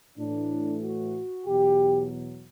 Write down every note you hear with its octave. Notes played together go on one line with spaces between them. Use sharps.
A2 E3 D4
F#4
E2 B2 F#3 G4